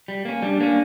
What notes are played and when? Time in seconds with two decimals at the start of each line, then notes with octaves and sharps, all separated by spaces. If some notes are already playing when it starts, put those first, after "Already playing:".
0.08 G3
0.25 A#3 C#4
0.42 G3 D4
0.61 A#3 C#4